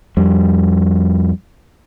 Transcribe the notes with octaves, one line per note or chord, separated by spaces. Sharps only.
F2 G3